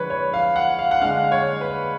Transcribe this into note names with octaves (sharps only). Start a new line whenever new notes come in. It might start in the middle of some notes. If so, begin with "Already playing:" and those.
Already playing: D3 F3 G#3 D4 B4 C#5
C#5
F5
F#5
F5
F#5
D3 G#3 D4 F5
C#5
B4